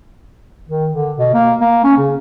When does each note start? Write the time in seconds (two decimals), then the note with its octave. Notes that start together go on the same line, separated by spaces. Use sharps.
0.69 D#3
0.91 D3
1.18 B2
1.34 A#3
1.60 A#3
1.84 C#4
1.98 C#3